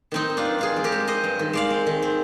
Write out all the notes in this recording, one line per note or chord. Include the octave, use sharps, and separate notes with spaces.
D#3 C4 D#4
D#3
D4 F4
G2
G2 F4 G#4
C4
G4 A#4
G#3
C4 C5 D#5
G2
D#3
G#3 D5 F5
C4
D#3
C4